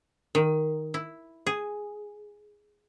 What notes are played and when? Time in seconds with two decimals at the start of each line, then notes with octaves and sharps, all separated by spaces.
0.35 D#3
0.94 E4
1.47 G#4